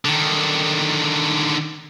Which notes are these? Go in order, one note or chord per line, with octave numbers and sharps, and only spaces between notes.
D3 D#3